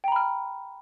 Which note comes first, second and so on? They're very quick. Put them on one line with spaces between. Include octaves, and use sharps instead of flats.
G5 A#5 B5 F6